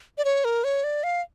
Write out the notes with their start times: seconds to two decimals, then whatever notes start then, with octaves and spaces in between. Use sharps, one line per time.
0.18 D5
0.25 C#5
0.44 A#4
0.64 C#5
0.84 D5
1.04 F5